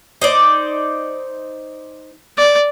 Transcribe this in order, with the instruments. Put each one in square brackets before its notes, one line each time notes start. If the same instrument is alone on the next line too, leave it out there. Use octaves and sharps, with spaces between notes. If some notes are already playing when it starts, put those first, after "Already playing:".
[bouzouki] D#4 C5 D5
[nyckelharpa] D5